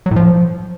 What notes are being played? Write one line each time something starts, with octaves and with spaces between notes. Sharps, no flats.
F#3
A2
F3